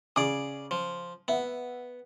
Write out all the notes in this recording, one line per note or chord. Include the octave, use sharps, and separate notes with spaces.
C#3 G#4 D5 D6
F3
B3 E5 F#5